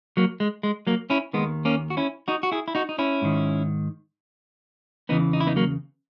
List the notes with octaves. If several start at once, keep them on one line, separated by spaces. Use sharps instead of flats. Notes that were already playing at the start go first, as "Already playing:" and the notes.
F#3 A#3
G#3
G#3
F#3 A#3
C#4 E4
D#2 D#3 G#3 B3
A#3 C#4
F#4
C#4 E4
D#4 F#4
F#4
E4 G#4
E4
D#4 F#4
D#4
C#4 E4
G#2 D#3
E2 C#3 E3 B3 D#4
D#4
E4
B3 D#4
F#3 A#3